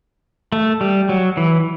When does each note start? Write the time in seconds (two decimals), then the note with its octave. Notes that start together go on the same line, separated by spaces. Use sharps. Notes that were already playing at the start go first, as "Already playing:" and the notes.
0.52 A3
0.81 G3
1.09 F#3
1.37 E3